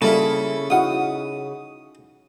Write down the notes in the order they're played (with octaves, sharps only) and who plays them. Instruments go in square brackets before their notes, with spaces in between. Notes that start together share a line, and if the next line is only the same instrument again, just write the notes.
[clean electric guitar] C#3 [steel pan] G3 A#3 [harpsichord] E4 A4 [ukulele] F4
[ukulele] D#4 F#5 [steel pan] E4 F#4 F5 [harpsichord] D#6